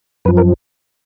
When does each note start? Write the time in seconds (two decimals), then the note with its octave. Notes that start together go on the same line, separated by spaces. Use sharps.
0.25 F#2 B4
0.28 F3
0.37 A#4